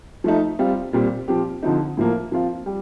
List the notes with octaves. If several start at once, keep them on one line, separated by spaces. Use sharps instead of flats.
F3 A3 D#4
G3 C4 F4
A#2 G3 C4
F3 C4 G4
D3 F3 C4 D#4
A2 F3 A#3
F3 C4 F4
G3